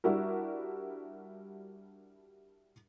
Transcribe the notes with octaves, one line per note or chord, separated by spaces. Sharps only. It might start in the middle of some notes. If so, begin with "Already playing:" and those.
G3 D4 E4 F#4 A#4